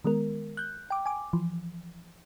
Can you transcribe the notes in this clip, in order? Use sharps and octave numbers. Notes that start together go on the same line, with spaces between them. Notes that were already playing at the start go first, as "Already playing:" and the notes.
D#3 G#3 B3 A#4
F#6 G6
G5 D6
G#5 D6
E3 F3